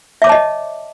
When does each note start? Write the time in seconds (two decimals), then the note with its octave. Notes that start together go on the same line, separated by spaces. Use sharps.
0.22 E5
0.24 D6
0.27 C#5
0.29 A5
0.32 D#5